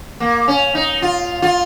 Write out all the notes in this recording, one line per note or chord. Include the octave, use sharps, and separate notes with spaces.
A#3
C#4
D#4
F4
F4